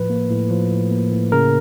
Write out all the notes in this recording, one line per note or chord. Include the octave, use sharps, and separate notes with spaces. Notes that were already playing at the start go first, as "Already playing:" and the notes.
Already playing: A2 F3 B4
A#3
A2
F3
A2
A#3
A2
C#3 A#4